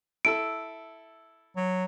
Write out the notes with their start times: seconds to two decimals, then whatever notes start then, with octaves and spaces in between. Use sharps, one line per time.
0.25 E4 A4 E6 D7
1.57 F#3